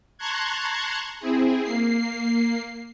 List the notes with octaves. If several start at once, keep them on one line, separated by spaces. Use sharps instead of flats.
A5 A#5 C6 C#6 F#6 G#6
C4 E4 G#4
A#3 C7